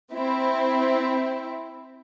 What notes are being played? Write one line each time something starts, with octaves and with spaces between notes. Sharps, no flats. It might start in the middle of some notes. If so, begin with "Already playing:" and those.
C4 E4